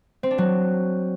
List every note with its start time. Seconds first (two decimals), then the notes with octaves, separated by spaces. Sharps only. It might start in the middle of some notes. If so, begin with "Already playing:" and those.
0.23 C4
0.31 D4
0.38 F#3